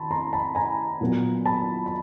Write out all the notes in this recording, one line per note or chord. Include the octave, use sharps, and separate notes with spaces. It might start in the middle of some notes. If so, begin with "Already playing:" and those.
Already playing: D#3 A5 B5 C6
A#5 C6
A5 B5
G#5 A#5
A#2 F#3 B3
A5 B5
B5